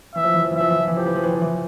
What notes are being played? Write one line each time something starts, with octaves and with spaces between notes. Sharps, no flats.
E3 E5
F3
E3
F3
E3
F3 E5
E3
F3
E3
F3 G4
E3
F3
E3
F3
E3